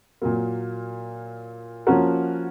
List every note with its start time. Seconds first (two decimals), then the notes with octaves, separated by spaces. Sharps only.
0.22 A#2 F#3 A#3
1.87 F3 A#3 C#4 F#4 A#4